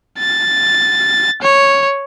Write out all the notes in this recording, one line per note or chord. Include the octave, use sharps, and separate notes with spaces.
A6
C#5